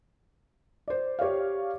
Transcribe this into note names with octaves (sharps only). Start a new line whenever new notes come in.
C5 D5
G4 C#5 D5 F5